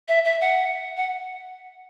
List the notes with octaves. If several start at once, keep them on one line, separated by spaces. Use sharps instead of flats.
E5
E5
F#5
F#5